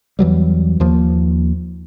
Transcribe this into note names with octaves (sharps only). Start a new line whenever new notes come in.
E2 E3 F#3 G3
D#2 F3 A#3